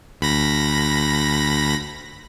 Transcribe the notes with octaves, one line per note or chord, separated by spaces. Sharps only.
D2 B5 A#6